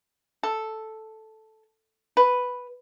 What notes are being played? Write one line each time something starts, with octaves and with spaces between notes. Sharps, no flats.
A4
B4